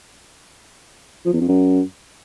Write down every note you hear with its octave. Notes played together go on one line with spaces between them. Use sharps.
F3
E2
F2
F#2